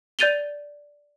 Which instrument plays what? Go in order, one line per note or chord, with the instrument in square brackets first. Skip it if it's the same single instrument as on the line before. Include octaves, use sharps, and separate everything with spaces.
[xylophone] D5 G6 A6 D#7 F7 G7